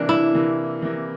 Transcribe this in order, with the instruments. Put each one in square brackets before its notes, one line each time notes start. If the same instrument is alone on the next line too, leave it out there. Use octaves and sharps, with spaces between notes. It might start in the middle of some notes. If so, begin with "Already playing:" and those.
Already playing: [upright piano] C3 E3 A#3 [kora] D4
[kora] E4
[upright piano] C3 E3 A#3
C3 E3 A#3